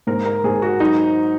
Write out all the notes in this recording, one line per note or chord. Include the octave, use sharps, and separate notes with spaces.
G#2 A#4
A#4
G#2 G#4
F#4
F#3 D#4